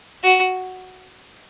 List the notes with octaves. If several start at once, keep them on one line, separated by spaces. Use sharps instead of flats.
F#4